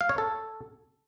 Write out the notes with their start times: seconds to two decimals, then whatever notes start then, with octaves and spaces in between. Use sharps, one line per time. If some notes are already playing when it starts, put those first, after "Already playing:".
0.01 F5
0.09 C#5
0.18 A4